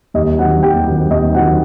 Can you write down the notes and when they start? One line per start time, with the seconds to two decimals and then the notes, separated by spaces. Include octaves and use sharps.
0.14 D#2 D#5
0.39 D#3 F#3 C4 F#5
0.62 D#2 G4 G5
0.87 D#3 F#3 C4
1.10 D#2 D#5
1.34 D#3 F#3 C4 F#5